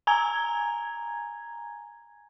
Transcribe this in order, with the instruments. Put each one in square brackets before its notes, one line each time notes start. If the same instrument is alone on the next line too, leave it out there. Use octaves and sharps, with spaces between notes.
[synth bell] G#5 A#5 G#6